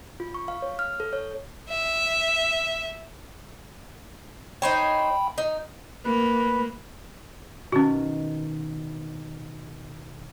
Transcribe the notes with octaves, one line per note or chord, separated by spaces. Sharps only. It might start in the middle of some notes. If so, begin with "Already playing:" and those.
F4
C#6
F5
C#5
F6
A4
C#5
E5
D#4 C5 C#5 G5 B5
D#4
A#3 B4
B2 D#3 C#4 F#4